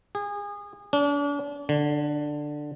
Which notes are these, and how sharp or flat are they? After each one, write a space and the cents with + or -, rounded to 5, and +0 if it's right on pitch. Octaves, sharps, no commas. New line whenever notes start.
G#4 -30
D4 -40
D3 +10